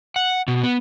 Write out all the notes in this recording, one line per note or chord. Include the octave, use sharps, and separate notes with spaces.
F#5
B2
B3